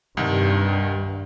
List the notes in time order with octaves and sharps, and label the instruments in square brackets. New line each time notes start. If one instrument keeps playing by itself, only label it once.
[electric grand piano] C2 D#3 [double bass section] G2